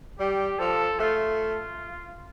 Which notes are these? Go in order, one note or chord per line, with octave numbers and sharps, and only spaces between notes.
G3 G4
F3 A4
A3 F4